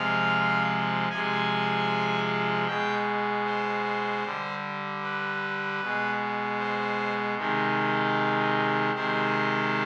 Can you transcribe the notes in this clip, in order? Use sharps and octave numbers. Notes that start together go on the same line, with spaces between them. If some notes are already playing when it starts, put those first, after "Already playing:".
Already playing: C3 F3 G#3 F5
C3 F3 G#3 G#5
B2 G#3 G5
C5
D3 G3
B4
B2 G#3
C5
C3 D#3 G#3
C3 D#3 G#3 C5